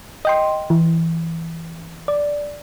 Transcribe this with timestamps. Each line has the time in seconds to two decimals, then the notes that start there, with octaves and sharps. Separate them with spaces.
0.25 D#5 G5 C6
0.70 E3
2.08 D5